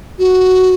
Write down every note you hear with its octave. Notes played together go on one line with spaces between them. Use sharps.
F#4